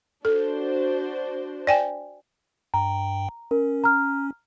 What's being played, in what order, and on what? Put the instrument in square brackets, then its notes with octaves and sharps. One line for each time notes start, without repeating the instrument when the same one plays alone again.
[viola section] D4 F#4 C5 [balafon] A4
[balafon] D5 G5 G#5
[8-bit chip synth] G2 G5 [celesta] A#5
[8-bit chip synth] C#4 [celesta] A#4
[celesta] A#5 F6